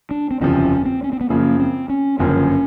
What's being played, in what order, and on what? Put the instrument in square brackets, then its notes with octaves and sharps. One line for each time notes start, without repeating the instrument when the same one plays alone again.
[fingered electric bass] D4
C4
[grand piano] F#1 E2 C3 F3 [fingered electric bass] C#4
[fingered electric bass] C4
C#4
C4
B3
[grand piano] F#2 C#3 F3 [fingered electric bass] A#3
[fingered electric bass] C4
C#4
[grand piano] G1 F#2 C#3 F3 A#3 [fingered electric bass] C#4